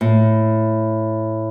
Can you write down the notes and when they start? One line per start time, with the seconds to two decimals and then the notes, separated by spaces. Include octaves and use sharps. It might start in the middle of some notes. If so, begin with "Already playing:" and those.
0.01 A2